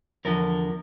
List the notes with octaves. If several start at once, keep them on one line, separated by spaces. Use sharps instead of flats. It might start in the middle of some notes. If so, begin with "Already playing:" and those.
E2 D3 F3 A#4